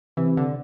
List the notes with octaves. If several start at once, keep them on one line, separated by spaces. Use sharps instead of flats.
C3 E3
D3